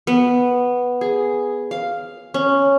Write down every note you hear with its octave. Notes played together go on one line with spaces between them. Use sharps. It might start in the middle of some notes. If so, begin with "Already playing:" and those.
B3
G#4
F5
C#4